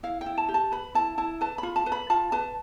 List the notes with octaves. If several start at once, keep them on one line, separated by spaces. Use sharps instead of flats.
E4 F5
G5
E4
A5
G4
A5
B4 B5
E4 A5
E4 A5
B4 A5
F4 B5
A5
B4
B5
F4 A5
B4 A5